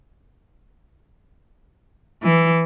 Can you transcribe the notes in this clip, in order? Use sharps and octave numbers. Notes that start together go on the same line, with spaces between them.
E3